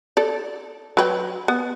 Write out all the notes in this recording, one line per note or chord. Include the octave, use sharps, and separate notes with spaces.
A4 D5
F#3 B4 G5
B3